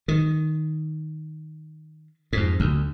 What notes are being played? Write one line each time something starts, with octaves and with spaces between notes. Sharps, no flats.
D#3
F2 G#2
D2 D3